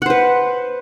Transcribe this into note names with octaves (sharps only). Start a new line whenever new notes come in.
B4 C5 F#5